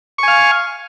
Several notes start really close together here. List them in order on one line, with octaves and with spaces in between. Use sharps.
C#6 G#5 F5